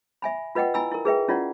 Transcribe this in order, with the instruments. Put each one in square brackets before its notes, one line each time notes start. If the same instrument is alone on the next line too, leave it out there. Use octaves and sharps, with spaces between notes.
[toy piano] E5 G#5 B5
F4 B4 D#5 F#5 G5
E4 G#5 B5 E6
E4 A#4
G#4 B4 E5 G5
C#4 E4 F4 D5 F#5